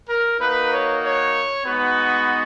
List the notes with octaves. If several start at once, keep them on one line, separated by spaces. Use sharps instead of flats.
A#4
A#3 D#4 F#4 B4
C#5
C#5
G#3 B3 D#4 F#4 B4